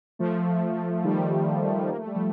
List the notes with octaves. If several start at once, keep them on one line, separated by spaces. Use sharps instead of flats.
F3 A3
D#3 G3
A#3
A3
G3
F3 A3